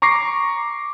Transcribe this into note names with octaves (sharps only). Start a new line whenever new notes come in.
A#5 C#6 D6 A#6 C7